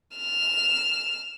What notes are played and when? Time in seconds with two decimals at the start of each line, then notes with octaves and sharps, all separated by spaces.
0.17 F6 E7